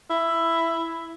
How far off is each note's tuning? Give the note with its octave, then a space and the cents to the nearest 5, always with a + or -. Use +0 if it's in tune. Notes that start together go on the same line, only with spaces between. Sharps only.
E4 +10